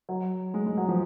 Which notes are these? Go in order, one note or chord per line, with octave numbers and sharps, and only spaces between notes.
F#3
G#3
G#3
F#3
F3